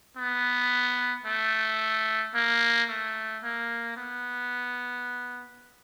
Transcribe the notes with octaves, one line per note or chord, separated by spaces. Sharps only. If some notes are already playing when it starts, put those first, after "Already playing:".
B3
A3
A#3
A3
A#3
B3